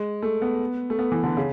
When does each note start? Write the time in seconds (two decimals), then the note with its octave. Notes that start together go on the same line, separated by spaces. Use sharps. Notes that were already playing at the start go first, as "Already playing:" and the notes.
Already playing: G#3
0.23 A3
0.42 B3
0.90 A3
0.99 B3
1.12 E3
1.23 D3
1.37 C#3